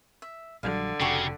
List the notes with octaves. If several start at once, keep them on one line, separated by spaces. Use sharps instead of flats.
E5
A#1 D3 F#3 G3 F5
F1 C#3 F#4 G4 A4